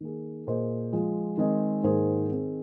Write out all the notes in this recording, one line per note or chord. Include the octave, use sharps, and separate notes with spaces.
D#3 A#3 G#4
A#2 A#3 G#4 C5 D#5
F3 G#3 F4
D#3 G#3 C4 G#4 D#5
G#2 D#3 A#3 G#4 C5
D#3 C4 G#4